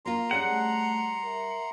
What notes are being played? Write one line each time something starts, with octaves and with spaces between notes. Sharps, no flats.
A#3 F4 A#5 C6
G3 C#4 G#4 F#5
A3
A#4 E5